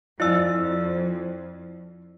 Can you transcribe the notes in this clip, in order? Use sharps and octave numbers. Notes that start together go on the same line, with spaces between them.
F2 E4 F4 D5 G#5 E6 A6